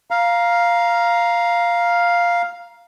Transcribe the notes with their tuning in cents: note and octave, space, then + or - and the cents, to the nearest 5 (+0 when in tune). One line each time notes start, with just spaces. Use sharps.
F5 +0 A#5 +15